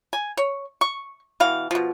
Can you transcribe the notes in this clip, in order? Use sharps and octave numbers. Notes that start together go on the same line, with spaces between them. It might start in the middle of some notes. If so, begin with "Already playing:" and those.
G#5
C#5
C#6
B2 E3 F5
B2 F3